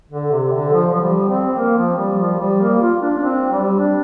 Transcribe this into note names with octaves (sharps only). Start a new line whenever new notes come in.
D3
C3
D3
F3
F3
G3
C4
A#3
F3
G3
F3
G3
A#3
F4
D4
D4
C4
G3
D4